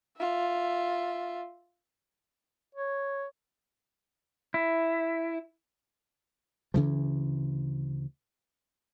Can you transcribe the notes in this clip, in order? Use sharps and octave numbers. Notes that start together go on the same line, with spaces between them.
F4 E5
C#5
E4
D2 C#3 E3 F3